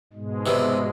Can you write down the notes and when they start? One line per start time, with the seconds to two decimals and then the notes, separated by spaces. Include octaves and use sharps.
0.13 G#2 B2 G#3
0.46 C3 E3 G3